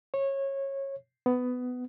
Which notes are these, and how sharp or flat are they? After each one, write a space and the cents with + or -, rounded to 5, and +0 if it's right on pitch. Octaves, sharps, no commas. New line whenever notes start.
C#5 -20
B3 +15